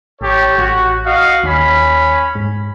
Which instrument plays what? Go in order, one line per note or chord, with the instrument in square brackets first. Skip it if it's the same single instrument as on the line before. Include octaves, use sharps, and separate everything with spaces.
[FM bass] A1 [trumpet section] G4 A4 C#5
[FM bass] A1 [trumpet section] F#4
[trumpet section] F#4 D#5 F5
[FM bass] D#2 [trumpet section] C#4 B5
[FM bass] G#2